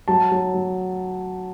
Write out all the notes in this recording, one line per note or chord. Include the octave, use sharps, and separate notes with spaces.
F#3 A5
F#3
F#3